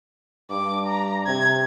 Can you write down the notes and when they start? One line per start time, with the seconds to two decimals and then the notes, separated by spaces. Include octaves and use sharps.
0.50 G2 D6
0.86 A#5
1.26 C3 G#6